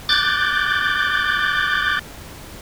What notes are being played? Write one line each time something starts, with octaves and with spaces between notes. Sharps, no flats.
D6 F#6 G6 A6